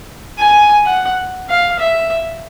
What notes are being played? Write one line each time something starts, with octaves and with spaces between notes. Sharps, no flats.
G#5
F#5
F5
E5